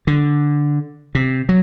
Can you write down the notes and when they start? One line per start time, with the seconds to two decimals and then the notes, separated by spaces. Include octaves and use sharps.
0.07 D3
1.15 C3
1.49 F#3